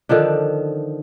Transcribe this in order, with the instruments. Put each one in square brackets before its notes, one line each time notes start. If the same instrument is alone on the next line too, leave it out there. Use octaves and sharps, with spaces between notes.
[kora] D3 D#3 F3 D4